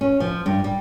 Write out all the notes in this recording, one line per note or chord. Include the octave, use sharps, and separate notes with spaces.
C#4
F3
G2
G3